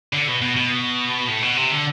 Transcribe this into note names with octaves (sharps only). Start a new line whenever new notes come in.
D3
B2
B2
B2
A2
B2
C3
D3